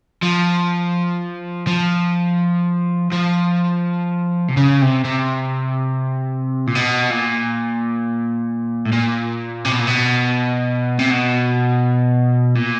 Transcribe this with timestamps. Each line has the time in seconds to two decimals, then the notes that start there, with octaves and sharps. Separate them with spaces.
0.22 F3
1.67 F3
3.12 F3
4.48 C3
4.57 C#3
4.82 C3
5.05 C3
6.67 A#2
6.75 B2
7.10 A#2
8.85 A2
8.92 A#2
9.65 C3
9.72 B2
9.80 A#2
9.88 B2
10.99 C3
11.10 B2
12.56 A#2